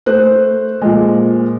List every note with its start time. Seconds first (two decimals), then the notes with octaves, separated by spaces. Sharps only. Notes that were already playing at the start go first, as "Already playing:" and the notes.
0.06 A3 C5 F#6
0.81 A#2 F3 G#3